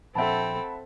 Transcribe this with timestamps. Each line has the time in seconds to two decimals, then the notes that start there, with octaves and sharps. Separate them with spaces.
0.15 A#1 C4 A4 E5 F#5 G5 A5 B5